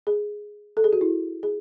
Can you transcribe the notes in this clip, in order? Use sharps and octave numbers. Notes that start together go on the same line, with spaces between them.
G#4
A4
G#4
F#4
E4
G#4